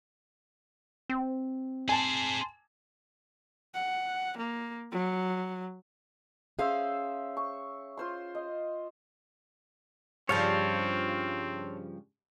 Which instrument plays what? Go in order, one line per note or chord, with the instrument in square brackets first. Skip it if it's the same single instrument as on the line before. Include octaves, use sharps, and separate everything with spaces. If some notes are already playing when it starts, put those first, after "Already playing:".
[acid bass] C4
[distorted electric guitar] G#4 C5 [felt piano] G#5 A5
[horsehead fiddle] F#5
A#3
F#3
[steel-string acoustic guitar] C#4 G#4 F5 [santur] C5 E5
[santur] C#6
F4 C5 C6
D#5
[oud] G2 C#3 F3 [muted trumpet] C4 [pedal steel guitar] C#5 F5 A5